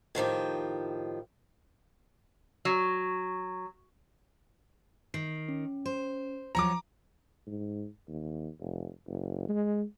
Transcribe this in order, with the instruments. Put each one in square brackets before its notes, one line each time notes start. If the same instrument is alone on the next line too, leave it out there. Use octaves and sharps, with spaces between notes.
[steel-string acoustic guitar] A2 D#3 F3 G4
[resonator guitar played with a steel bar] F#3
[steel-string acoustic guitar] D#3 [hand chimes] C7
[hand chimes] C#4
[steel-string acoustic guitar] C5
[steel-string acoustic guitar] F3 F#3 C#5 [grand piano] A#5 D6
[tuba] G#2
D#2
F1
F#1
G#3